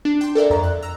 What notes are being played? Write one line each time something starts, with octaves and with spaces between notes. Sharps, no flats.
D4
G5 C6
A4 A#4 D5 E5
F2 A#5
F#6
A#5 E6